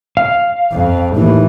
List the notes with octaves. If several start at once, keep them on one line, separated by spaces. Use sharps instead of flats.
F5
F2
D#2 A2 E3